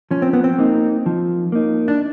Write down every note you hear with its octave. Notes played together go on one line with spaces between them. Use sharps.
F3 C#4
C4
B3
C4
A#3 D#4
F3
A#3 D#4
D4